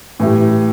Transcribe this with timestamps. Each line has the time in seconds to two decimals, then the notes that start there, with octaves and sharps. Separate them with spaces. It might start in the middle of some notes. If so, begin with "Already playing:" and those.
0.19 A2 E3 A3 E4 G4